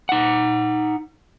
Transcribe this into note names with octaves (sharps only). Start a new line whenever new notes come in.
D#4 F#5